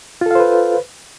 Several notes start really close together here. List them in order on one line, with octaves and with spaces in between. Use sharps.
F4 A4 F5 C5 B4